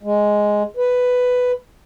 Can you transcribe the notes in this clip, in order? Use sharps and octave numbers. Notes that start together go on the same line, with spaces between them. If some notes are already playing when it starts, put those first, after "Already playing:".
G#3
B4